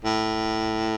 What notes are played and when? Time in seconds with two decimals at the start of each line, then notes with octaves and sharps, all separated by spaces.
0.05 A2